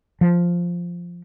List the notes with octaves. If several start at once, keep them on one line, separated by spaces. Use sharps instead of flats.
F3